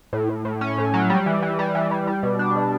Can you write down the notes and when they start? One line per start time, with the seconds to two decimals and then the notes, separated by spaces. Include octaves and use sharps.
0.13 A2
0.29 A2
0.45 A2
0.61 C#4
0.78 A2
0.94 F#3
1.10 G3
1.26 E3
1.43 E3
1.59 G3
1.75 E3
1.91 G3
2.07 G3
2.23 B2
2.39 D4
2.56 B2